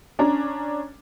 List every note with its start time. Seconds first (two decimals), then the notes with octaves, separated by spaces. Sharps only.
0.19 C#4 D4 A#5